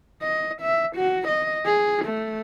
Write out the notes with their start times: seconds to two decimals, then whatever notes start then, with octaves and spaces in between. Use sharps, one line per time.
0.22 D#5
0.61 E5
0.96 F#4
1.28 D#5
1.66 G#4
2.05 A3